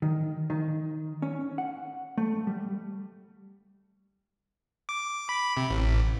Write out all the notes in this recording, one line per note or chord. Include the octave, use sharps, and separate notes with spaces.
D#3
D#3
C#4
F#5
A3
G3
D6
B5
C3
A1